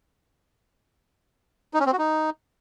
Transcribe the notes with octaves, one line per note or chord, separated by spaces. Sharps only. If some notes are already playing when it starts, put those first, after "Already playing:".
D#4
C#4
C4
F#4
D#4